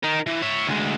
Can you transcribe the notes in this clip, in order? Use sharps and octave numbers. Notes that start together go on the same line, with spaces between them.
D#4 A#4
E3
C#5 E5
D2 G#3